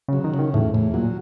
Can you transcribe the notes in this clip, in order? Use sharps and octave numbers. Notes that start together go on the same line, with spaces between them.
C#3 F#3
D#3
C#3
D#3
E2 A2
E2 A2
A#2 F#3